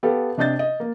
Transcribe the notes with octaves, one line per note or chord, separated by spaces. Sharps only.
B3 G4 A4 F5
C3 D4 D#5 G6 A6
D#5
A#3